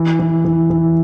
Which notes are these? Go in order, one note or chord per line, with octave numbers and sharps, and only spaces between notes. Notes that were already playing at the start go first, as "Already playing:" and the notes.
Already playing: E3
E3
E3
E3